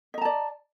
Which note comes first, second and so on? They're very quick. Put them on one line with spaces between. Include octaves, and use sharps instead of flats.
D#5 A#5 A5 D5